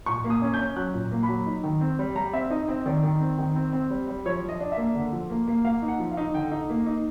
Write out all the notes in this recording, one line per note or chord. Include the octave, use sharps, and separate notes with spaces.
A#2 C#6
A#3
D#6
C#4
G6
C#4
F#3 F#6
A#2
A#3
B5
F#3
D#4
D#3
C4
G3
G3 A#5
C4 E5
D#4 D#5
C4 D#5
D#3 D5
D#3
C4
D#3
C4
C4
G3
G3
F3 C#5
F3
D#5
D4
E5
A#3
D3
F3
A#3
A#3
A#3 F5
D#4
F#5
F3
F5
D#4
D3 G5
D#4
A#3
D#4